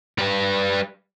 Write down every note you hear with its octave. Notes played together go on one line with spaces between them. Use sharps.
G3 B4